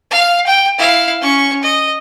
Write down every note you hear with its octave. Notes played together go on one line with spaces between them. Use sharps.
F5
G5
E4 F5
C#4 C#6
D#5